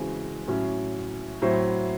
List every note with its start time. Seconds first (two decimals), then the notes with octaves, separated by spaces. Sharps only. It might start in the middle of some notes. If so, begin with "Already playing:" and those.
Already playing: C#3 E3 G#3 C4 F#4
0.47 A2 F#3 C#4 F#4
1.42 A2 F#3 C4 E4 C5